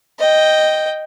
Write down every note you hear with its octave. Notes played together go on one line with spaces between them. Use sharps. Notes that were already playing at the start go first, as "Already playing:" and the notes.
D#5 G5